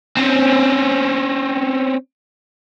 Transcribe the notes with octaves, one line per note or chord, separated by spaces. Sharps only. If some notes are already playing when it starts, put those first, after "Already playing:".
C4 C#4